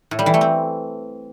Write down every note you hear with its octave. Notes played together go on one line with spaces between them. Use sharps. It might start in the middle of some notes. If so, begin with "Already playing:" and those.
A2
G3
E3
A3
C4